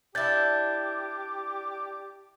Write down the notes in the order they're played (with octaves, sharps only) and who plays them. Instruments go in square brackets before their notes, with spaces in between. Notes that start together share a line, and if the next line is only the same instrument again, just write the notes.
[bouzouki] D4 E4 [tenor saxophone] G4 [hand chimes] G6 A6